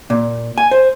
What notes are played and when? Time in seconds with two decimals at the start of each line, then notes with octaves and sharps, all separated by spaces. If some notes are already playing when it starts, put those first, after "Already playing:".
0.10 A#2
0.58 G#5
0.71 C5